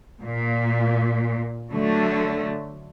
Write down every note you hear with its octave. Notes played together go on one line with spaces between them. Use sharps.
A#2
D3 F#3 A3